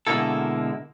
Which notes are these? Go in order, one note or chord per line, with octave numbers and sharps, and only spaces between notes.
B2 D3 G#3 A#3 E4 A4